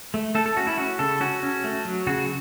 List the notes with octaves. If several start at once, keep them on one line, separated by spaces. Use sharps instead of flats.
A3
A3 A4
A4
C#4 F#4
E4
C#4 F#4
C#3 A4
C#4 F#4
C#4
A3
F#3
C#3 F#4